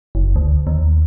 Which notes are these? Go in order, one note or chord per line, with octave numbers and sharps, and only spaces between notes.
F#1
D2
D#2